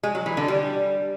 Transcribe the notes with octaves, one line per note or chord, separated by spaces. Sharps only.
G#3
F#3
E3
D3
G3